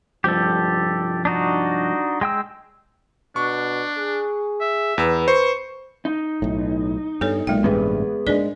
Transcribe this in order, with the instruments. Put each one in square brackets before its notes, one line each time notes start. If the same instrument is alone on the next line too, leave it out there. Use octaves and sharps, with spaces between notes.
[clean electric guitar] C2 G2 F3 [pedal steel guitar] G4 A4
[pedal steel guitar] D4 D#4 F#4
G#3 G5 E6
[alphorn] B2 [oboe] D4 [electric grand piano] C#6
[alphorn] G#4
[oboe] E5
[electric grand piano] E2 E6 [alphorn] B4
[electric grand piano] C5 [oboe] C#6
[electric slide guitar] D#4
[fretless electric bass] B1 A2
[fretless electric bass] G2 [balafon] B3 A4 C#5
[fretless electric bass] B1 A#2 [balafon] G#3 G5
[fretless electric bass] A1 G2 C3 [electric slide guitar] B3 G#4 B4
[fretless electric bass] G#2 C#3 G#3 [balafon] D4 A#4 D5